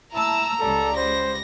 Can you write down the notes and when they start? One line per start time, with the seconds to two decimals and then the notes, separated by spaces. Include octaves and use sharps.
0.13 E4 A5 A#5 E6
0.60 C#2 G3 A4
0.97 C5 A#6